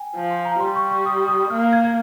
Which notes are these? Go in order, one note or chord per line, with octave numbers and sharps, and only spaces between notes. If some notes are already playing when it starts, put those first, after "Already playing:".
Already playing: G5 G#5
F3
C6
A#5
G3 C6
C#6
C#6
D#6
D#6
A#3 F6
G#6
G#6